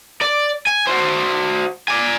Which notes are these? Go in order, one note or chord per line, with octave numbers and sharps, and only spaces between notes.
D5
G#5
F#4 C5
D5 G#5